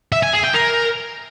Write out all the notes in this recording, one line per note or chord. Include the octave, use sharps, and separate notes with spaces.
E5
G#5
G#4
G5
A#4